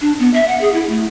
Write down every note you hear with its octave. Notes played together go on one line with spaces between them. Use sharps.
D4
B3
E5
F#5
G#4
E4
A3